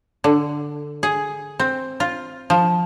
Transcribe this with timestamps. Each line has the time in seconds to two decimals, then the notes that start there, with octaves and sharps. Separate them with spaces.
0.24 D3
1.03 G#4
1.59 C4
2.00 F4
2.50 F3